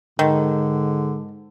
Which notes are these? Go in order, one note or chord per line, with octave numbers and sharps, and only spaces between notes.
G#2 D3 D#3